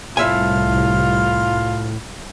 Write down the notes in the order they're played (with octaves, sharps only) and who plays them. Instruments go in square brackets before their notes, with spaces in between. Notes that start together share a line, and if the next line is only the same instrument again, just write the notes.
[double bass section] C2 [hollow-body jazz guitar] A2 E5 G#5 [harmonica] F4 F6